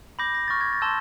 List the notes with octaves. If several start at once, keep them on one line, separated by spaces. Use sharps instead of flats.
B5 D6 G6 A#6
A#6
C#6 F6 A6
G#6
A6
A5 C6 E6 G6